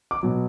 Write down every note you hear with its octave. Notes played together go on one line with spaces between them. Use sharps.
D6
B2 F#3